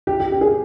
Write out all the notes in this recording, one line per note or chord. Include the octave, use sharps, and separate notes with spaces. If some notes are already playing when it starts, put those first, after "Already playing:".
G4
G4
G4
G#4